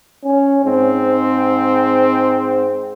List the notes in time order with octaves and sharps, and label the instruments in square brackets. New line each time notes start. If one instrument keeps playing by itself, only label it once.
[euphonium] C#4
[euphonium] G#2 [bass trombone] C4